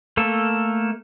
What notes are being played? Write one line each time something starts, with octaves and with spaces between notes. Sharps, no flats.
A3 A#3 A4